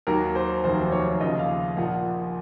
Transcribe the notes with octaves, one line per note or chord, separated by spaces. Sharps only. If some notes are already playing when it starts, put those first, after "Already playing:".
D#2 D#3 F#3 A#4
C5
F1 D#2 D#3 F#3 C5
C#5
D#2 C#3 F3 D#5
F5
A#1 A#2 F3 F#5